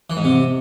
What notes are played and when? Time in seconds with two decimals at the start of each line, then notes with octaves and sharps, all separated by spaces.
0.10 E3
0.17 G#2
0.24 C3